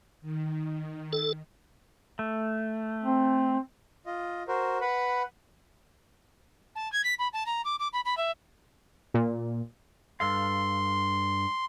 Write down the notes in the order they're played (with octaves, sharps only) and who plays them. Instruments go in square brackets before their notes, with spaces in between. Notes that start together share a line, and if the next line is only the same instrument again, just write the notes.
[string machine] D#3
[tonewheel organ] A4
[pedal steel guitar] A3
[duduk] C4
[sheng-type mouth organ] F4 D#5
F#4 A#4 C5
B4 F#5 B5
[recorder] A5
G#6
B6
B5
A5
A#5
D6
D6
B5
B5
E5
[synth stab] A#2
[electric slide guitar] G2 A4 F5 [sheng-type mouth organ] C6